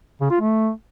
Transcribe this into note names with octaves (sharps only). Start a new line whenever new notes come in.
C#3
F4
A3